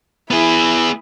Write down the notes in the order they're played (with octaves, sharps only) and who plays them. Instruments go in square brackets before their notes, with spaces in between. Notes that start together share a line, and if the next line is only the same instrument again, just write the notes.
[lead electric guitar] B3 G#4 [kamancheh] E4